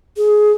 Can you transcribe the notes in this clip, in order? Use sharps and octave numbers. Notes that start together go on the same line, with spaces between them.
G#4